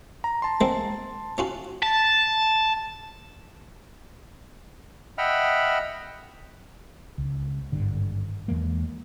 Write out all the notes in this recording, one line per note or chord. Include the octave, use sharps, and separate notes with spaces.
A#5
A5 C6
G#3 A#3 C4
C#4 F4 F#4
A5
D#5 E5 F#5 G5 B5 F6
C#2
G#1 G2 D3
E2 E3 G#3 A#3